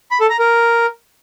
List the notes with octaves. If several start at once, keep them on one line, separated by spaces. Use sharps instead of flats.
B5
A4
A#5
A#4